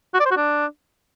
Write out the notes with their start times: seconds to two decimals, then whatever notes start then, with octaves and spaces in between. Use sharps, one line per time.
0.14 F#4
0.20 D5
0.26 C5
0.31 F#4
0.37 D4